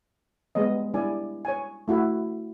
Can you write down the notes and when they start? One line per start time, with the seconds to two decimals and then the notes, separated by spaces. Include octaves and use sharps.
0.55 G3 G#3 B3 D#5
0.94 G3 D4 E4 D5 G#5
1.45 C#5 G#5
1.88 A3 E4 F#4